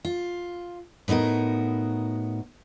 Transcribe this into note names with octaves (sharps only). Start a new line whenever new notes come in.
F4
A2 B3 D#4 F#4 A#4